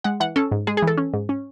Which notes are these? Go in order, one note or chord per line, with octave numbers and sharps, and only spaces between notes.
G#3 F#5
E3 F#5
C#4 A4
G#2
G#3 G#4
G#4
E3
A4
C#4
G#2
C#4